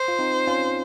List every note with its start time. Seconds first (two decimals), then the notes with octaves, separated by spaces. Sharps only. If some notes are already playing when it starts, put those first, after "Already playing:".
Already playing: C5
0.08 F4
0.19 C4 D#4
0.47 C#4 F4